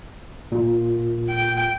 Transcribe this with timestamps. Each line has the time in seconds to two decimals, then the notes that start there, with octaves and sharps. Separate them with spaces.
0.52 A#2
1.29 G5